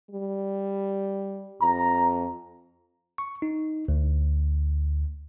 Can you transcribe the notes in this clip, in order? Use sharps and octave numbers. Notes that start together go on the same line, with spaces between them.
G3
F2 A#5
C#6
D#4
D2